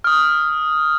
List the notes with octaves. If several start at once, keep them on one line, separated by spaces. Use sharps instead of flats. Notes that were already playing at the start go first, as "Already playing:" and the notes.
D#6 F6